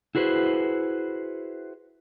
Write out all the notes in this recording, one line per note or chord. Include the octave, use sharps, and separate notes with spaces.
E4 F#4 G#4 B4 C5